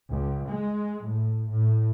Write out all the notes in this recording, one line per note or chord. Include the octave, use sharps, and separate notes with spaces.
C#2
G#3
A2
A2